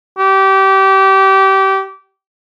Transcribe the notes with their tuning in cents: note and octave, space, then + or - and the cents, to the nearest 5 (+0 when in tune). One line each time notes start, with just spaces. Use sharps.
G4 -25